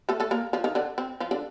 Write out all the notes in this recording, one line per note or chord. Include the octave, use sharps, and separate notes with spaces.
A3 A4
A3 A4
A#3 A#4
F3 F4
D#3 D#4
D3 D4
C4
F3 F4
D3 D4